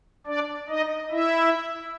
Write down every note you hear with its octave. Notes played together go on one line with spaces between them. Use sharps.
D4 D5
D#4 D#5
E4 E5